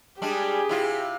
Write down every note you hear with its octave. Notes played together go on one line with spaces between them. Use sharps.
G3 G#3 D4 G4 G#4
C3 E4 F4